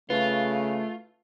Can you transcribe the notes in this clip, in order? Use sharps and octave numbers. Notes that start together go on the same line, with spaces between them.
C#3 A3 F4 B4